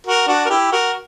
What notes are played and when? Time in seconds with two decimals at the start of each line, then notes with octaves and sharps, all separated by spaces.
0.07 F#4 A#4
0.28 D4 F#4
0.45 A#4
0.50 E4 G4
0.72 F#4 A#4